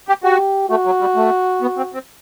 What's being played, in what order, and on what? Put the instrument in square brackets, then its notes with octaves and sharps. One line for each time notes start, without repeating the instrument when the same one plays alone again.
[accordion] G4
[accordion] F#4 [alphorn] G4
[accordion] A3 [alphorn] F#4
[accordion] F#3
G3
A3
B3
C4
C4